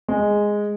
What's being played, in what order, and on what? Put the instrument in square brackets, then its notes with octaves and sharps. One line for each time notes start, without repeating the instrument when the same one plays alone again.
[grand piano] G#3